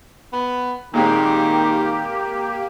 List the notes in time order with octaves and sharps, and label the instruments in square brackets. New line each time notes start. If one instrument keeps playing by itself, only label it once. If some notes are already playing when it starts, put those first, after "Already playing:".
[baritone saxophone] B3
[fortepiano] A#2 G#3 C4 [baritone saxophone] D#3 [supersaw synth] A#3 G4